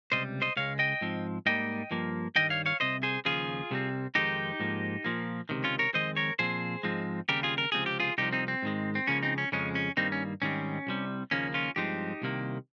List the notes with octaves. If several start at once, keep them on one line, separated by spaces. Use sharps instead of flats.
C#2 C3 G3 C5 D#5
C5 D#5
C#2 C#3 G#3 C#5 F5
D#5 G5
G#2 F3 C4
G#2 G3 A#3 D#5 G5
G2 F3 A#3
G2 D#3 G3 D#5 G5
C#5 F5
C#5 F5
C2 C3 C5 D#5
G#4 C5
D#2 C#3 F3 F4 G#4
C2 C3 G3 C4
F2 D#3 G#3 C4 D#4 G4
G#2 F3 A#3
A#2 F3 A#3
C#2 C3 D#3
C#4 F4
A#4 C#5
F2 D#3 G#3 C4 C5 D#5
A#4 C#5
A#2 F3 C4 G#4 C5
G#2 F3 G#3 C4
D#2 C#3 G3 C4 G4 A#4
F4 G#4
A#4
C#2 C3 F3 C4 G#4
G4
F4 G#4
C2 C3 F3 D#4 G4
C4 D#4
C4
G#2 D#3 G#3
C4
C#2 C#3 F3 A#3 C#4
C4 D#4
C#4
F2 C#3 F3 G#3 C#4
C#4
G2 D#3 G3 A#3 C4 D#4
C#4
G#2 D#3 G3 C4 C#4
C2 C3 G3
D#2 C#3 F3 A#3 C#4
C#4 F4
G2 F3 G#3 C4 D#4 G4
C2 C3 D#3 A#3